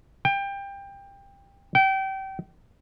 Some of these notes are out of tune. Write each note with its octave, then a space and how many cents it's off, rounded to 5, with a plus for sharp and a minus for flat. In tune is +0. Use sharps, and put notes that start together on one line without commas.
G5 +20
G5 -30